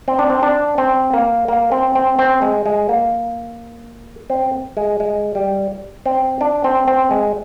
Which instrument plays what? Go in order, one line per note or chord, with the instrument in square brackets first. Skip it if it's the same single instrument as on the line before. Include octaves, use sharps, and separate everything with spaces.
[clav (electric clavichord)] C4
D4
C4
D4
C4
A#3
A#3
C4
C4
C4
G#3
G#3
A#3
C4
G#3
G#3
G3
C4
D4
C4
C4
G#3